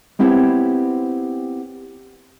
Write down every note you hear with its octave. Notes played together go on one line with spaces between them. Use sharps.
B3 C4 E4 G4 C5 C#5